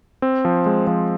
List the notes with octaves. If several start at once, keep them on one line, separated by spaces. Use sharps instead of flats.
C4
F3
G#3
F3